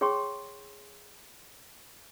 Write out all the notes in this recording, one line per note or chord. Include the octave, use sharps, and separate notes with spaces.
G#4 C#5 G5 C6 C#6